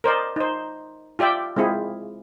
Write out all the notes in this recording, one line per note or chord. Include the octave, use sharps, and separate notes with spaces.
A#4 C5 D5 D#5
D#4 C5
F4 G4 D5 E5 G5
G#3 C4 E4 F4 G#4